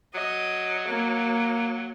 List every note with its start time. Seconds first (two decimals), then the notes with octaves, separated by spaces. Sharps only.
0.14 F#3 D#5
0.88 A#3